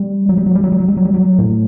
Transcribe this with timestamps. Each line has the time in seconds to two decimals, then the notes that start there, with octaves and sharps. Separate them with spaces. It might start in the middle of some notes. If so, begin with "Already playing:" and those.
Already playing: G3
0.29 F#3
0.37 G3
0.46 F#3
0.55 G3
0.64 F#3
0.72 G3
0.80 F#3
0.88 G3
0.97 F#3
1.05 G3
1.14 F#3
1.38 A2